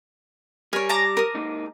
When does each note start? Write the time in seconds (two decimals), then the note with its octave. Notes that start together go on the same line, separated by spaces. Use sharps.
0.73 G3 A#4 C#5 G#5
0.89 A5 A#5 D6
1.17 A#4 D#6
1.34 G#2 A#3 D#4